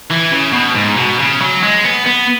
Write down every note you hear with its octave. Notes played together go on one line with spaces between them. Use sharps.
E3
C#3
B2
G#2
B2
C#3
F#3
G#3
B3
B3